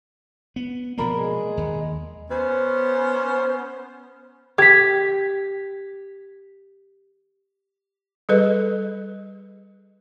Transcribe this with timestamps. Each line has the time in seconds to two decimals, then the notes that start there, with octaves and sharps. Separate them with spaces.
0.56 B3
0.98 B2 F3 A#3 D4 A#4 B5
1.15 G#3 G#4
1.57 D#2
2.30 B3 C#4 C5
4.58 G4 G#6 B6
8.29 G3 G#4 A4 B4 D#5